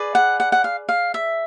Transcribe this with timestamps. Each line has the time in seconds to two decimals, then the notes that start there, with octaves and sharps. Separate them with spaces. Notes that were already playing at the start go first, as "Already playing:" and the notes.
Already playing: G#4 B4 D5
0.15 F#5
0.40 F#5
0.52 F#5
0.64 F5
0.89 F5
1.14 E5